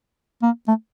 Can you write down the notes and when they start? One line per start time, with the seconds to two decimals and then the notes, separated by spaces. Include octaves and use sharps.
0.42 A#3
0.68 A3